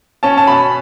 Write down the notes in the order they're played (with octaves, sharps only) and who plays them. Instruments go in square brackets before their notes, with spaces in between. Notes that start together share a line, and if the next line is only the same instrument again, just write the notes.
[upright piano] C#4 A5
A5
B2 B5